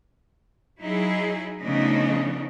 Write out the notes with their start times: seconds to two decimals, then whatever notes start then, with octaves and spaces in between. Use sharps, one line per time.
0.81 F#3 D#4 E4 G#4
1.62 C#3 F3 A3 B3 D4 D#4